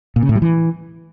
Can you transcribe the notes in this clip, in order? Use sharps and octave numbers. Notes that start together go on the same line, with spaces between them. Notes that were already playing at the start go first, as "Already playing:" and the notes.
A#2
C#3
A2
G3
E3